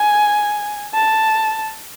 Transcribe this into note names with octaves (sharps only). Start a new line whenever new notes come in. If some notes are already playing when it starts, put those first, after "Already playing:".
Already playing: G#5
A5